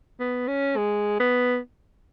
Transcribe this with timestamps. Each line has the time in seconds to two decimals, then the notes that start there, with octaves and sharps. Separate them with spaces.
0.20 B3
0.48 C#4
0.77 G#3
1.20 B3